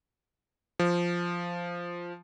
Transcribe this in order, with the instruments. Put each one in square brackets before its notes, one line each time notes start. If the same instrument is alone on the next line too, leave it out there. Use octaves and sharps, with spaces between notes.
[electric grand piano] F3